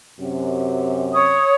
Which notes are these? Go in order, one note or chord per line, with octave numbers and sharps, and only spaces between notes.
F#2 C3
C#5 D#6